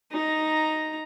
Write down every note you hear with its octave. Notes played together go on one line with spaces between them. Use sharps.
D#4 A#5